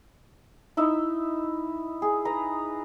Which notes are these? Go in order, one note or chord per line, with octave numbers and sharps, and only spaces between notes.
D#4 E4 E5
G#4
B4 A#5